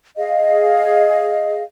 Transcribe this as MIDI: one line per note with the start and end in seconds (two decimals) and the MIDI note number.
0.17 1.63 68
0.17 1.63 75
0.17 1.63 77